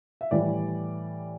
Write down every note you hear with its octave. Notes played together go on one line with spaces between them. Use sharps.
E5
A2 E3 G3 D5